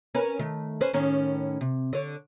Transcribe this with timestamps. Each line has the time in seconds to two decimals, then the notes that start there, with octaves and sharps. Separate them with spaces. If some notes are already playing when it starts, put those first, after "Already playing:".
0.15 C#4 A#4 B4
0.39 D#3 A3
0.81 C#4 B4 C5
0.93 A2 D#3 C#4
1.61 C3
1.93 D3 C#5